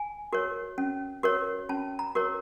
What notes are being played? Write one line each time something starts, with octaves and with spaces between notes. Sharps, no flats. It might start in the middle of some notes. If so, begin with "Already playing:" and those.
Already playing: G#5
F#4 A#4 C#5
C#4
F#4 A#4 C#5
C#4 A5
A#5
F#4 A#4 C#5